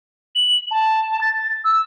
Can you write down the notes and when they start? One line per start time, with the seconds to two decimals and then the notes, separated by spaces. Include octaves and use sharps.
0.35 F#7
0.71 A5
1.21 A6
1.65 E6